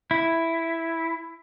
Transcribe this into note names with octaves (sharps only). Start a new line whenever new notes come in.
E4